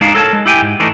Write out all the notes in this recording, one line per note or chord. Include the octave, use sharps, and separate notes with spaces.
G#3 D4 D#4 F5
A4 A#4 C#5 F#5 A5
G#3
E4 G4 G5 G#5
G#2
E3 A3 D4 D#4